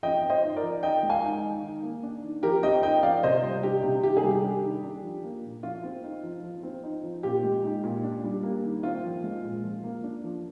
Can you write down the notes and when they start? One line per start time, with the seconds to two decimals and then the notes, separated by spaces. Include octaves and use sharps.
0.03 F3 D#5 G5
0.23 C4
0.29 C5 D#5
0.43 D#4
0.56 A#4 D5
0.63 F3
0.83 D#3 D#5 G5
1.03 G#3
1.09 F5 G#5
1.23 D#4
1.44 D#3
1.63 D#3
1.83 A#3
2.03 D4
2.23 D#3
2.43 F3 G4 A#4
2.63 C4 D#5 G5
2.83 D#4 D#5 G5
3.03 F3 D5 F5
3.23 C3 C5 D#5
3.43 G3
3.63 D4 G4
3.83 C3
4.03 D#3 G4
4.17 G#4
4.23 G3
4.31 G4
4.44 D4
4.63 D#3
4.84 D4
5.03 F3
5.23 A#3
5.43 A#2
5.63 F3 F4
5.83 C4
6.04 D#4
6.23 F3
6.43 F3
6.63 C4
6.83 D#4
7.04 F3
7.23 A#2 G4
7.43 G#3
7.63 D#4
7.84 A#2
8.04 D4
8.24 G3
8.43 A#3
8.64 D#3
8.83 C4 F4
9.04 F3
9.24 G#3
9.44 A#2
9.63 F3
9.84 A#3
10.04 D4
10.24 F3